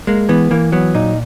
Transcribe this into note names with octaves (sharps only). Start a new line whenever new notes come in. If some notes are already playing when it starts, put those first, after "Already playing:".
G#3 A#3
E3 B3
E3 A#3
F#3 B3
A#2 D#4